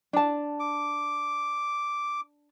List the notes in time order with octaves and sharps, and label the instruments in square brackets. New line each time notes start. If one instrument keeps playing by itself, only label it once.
[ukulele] D4 A5
[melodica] D6